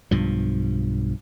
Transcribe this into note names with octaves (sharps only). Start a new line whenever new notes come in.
B1 G2 F3